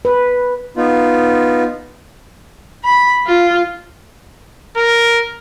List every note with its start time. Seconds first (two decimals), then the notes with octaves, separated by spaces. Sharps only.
0.05 B4
0.77 B3 D#4 F4
2.84 B5
3.27 F4
4.76 A#4